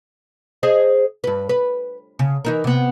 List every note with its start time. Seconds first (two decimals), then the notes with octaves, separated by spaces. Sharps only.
0.63 G#4 C5 D#5
1.24 G2 B4
1.49 B4
2.19 C#3
2.45 E3 D#4 A#4
2.64 C3 B3